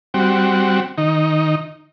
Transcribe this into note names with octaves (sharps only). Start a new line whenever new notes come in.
G3 C4 F#4
D#3 D#4